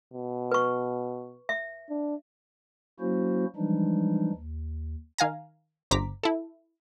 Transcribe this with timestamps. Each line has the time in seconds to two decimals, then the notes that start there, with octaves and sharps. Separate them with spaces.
0.14 B2
0.51 B4 C#6
1.49 E5
1.90 D4
3.00 F#3 A#3 C#4 E4 F#4 C5
3.56 E3 F3 G3 G#3 D4 D#4
4.33 D#2
5.18 D#3 F5 G#5 A#5
5.91 G1 C5 A#5 D6 B6
6.23 E4 A4